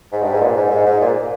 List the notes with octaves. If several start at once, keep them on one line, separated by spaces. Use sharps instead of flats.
G#2
G2
G#2
A#2
G#2
G#2
G#2
A#2